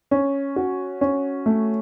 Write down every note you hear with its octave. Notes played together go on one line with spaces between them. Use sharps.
C#4
F#4
C#4
A3